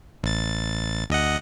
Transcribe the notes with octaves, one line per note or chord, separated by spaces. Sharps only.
A1 A6
D2 D#5 F#5